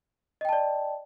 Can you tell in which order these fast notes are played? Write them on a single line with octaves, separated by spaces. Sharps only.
D#5 G5 A5 D5